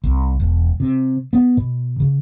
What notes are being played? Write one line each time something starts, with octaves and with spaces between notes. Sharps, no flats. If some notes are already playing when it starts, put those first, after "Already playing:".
C2
E1
C3
B3
B2
C#3